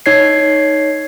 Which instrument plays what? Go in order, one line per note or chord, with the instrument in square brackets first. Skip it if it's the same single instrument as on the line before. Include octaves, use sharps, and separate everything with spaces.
[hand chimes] D#4 C#5 G#6 C7